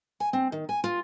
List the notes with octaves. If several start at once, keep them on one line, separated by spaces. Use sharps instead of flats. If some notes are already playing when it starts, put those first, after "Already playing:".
G#5
C4
D#3
G#5
F4